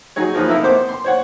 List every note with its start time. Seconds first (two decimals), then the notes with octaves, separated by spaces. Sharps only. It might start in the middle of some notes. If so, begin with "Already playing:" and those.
0.16 F#3 D#4 G#4 C#5
0.34 F3 A#3 D#4 B4
0.48 C3 D#4 E4 A4 A#4
0.63 B3 C5 D6
0.89 C6
1.04 C5 C#5 F#5